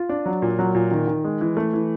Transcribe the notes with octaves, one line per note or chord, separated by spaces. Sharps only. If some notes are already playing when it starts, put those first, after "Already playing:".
Already playing: F4
D4
F#3
A#2
F#3
A#2
D#3
D#3
G#3
E3
A3
E3